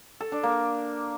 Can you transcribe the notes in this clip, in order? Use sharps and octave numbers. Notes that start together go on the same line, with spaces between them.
A4
D4
A#3